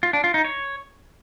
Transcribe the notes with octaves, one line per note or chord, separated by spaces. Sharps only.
F4
D4
F4
D#4
C#5